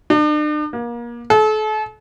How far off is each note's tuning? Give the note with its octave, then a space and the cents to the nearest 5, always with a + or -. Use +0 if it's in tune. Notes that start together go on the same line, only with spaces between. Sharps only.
D4 +45
A#3 +30
A4 -40